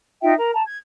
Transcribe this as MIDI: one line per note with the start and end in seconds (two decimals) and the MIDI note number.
0.22 0.34 63
0.22 0.34 65
0.22 0.34 76
0.22 0.34 79
0.37 0.52 70
0.37 0.52 82
0.54 0.62 81
0.54 0.62 82
0.66 0.78 92